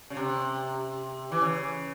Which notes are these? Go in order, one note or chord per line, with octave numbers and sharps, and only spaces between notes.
C#3
C3
E3
C#3